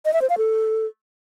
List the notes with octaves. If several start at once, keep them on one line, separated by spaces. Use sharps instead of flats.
D#5
E5
C5
F5
A4